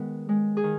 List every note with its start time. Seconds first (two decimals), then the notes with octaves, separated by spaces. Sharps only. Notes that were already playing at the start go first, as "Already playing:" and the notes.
Already playing: D#3 G#3 B3
0.29 G#3
0.57 G#4
0.64 D#3